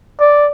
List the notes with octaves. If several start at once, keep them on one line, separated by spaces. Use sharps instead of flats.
D5